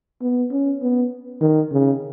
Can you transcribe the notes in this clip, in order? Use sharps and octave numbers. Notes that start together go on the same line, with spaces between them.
B3
C#4
B3
D#3
C#3